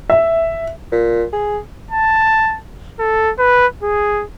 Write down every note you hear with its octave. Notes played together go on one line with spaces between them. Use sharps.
E5
A#2
G#4
A5
A4
B4
G#4